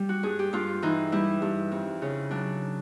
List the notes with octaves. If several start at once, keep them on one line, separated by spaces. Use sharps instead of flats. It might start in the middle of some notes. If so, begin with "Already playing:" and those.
Already playing: G3
F#4
G2 G#4
G4
G2 F4
E3 D#4
G3 E4
G2
F2
C#3
F#3 D4